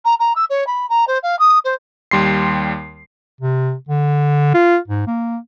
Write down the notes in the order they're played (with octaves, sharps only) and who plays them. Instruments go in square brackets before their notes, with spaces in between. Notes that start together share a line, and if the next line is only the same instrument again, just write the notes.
[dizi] A#5
A#5
E6
C#5
B5
A#5
C5
F5
D#6
C5
[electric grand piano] D#2 G3 C6 C7
[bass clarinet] C3
D3
F4
G#2
A#3